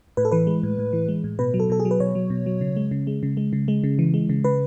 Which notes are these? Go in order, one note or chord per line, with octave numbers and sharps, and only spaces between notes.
A2 B4
A4
E3 B4
G#3
A2
A2
E3
G#3
A2
B2 B4
F#3
A4
B2 A4
G#4
F#3
B4
B2 C#5
F#3
B2
F#3
C#3
G#3
C#3
G#3
C#3
G#3
C#3
G#3
C#3
E3
G#3
C#3
C#3 B4